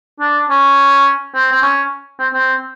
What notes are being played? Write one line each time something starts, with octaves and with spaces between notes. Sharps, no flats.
D4
C#4
C4
C4
C#4
C4
C4